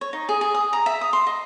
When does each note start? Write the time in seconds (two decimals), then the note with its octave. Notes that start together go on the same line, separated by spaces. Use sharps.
0.01 C#5
0.13 D#4
0.29 G#4
0.41 G#4
0.55 D#6
0.73 A#5
0.86 E5
1.01 D#6
1.13 C6
1.27 D#5